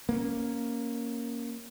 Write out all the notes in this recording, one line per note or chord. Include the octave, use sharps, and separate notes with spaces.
A#3 C#4